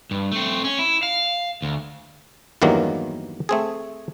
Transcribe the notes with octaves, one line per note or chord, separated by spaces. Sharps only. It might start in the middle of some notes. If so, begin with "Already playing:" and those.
G2
A3 C4
C#4
E4
F5
D2
E2 G2 D#3 E3 F#3 A#3
A3 C4 G#4